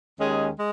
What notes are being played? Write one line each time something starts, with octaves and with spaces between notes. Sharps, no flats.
D#2 D#3 G#3 C#4 G#4
G#3